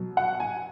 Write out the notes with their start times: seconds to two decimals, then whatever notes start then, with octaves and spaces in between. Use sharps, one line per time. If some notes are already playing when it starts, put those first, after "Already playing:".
Already playing: B2 F#3
0.17 F#5
0.40 G#5